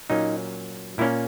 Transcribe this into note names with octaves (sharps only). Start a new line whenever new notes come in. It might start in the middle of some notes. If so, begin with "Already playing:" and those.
A#2 F#3 A#3 C#4 D#4
A#2 A#3 C#4 E4